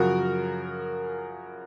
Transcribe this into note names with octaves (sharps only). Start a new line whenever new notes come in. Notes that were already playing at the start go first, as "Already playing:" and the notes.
Already playing: F#2 C#3 F3 F#4 A#4